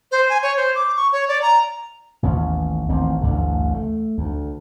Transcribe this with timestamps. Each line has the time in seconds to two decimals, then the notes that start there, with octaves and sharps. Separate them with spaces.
0.12 C5
0.30 G#5
0.43 C#5
0.57 C5
0.75 D6
0.96 C#6
1.12 C#5
1.28 D5
1.42 A#5
2.23 A1 D#2 B3 C#4
2.89 A1 D#3 A#3 C4
3.21 A1 D2 G2 D3
3.74 A3
4.18 D2